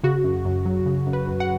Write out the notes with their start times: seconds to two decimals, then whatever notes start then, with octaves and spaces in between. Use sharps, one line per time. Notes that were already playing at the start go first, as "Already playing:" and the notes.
0.03 C#3 F#4
0.24 F#2
0.45 F#2
0.66 F#3
0.86 C#3
1.07 F#2
1.13 B4
1.27 F#2
1.40 F#5